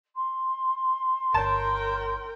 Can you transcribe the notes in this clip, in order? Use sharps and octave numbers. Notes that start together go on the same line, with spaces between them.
C6
G1 A#4 C#5 G5 A5